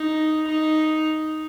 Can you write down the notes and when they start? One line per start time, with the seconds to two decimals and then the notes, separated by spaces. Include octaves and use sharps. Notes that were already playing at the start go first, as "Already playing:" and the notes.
Already playing: D#4
0.48 D#4